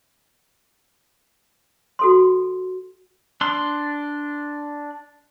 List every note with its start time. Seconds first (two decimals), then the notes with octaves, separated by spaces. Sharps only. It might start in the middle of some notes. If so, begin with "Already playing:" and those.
1.99 F#4 A4 C6
3.41 D4 C6 F#6